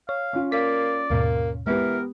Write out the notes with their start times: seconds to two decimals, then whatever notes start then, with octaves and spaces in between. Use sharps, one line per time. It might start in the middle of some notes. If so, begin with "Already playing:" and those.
0.09 C#5 F5
0.33 C#4 F4
0.52 A#3 D5 B6
1.10 D#2 G#2 B2 A#3
1.67 E3 G#3 B3 G4 A#4